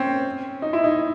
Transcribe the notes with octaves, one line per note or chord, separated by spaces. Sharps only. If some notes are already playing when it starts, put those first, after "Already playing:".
Already playing: C4 C#4
D#4
E4
D#4